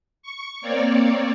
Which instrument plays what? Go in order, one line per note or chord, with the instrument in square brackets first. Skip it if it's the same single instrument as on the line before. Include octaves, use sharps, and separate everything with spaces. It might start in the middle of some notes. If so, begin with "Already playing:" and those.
[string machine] C#6
A#3 C4 C#5 D5